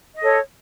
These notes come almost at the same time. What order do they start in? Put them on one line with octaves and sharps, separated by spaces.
D#5 A4 C#5